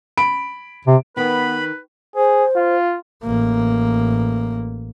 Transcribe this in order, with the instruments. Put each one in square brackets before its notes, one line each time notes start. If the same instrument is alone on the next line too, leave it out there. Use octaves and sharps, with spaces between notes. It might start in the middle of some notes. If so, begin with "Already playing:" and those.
[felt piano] B5 D7
[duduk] C3
[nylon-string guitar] D#3 [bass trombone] B3 [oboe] B4 [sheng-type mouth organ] B5
[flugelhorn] G#4 [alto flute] C5
[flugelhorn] F4
[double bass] A1 A#3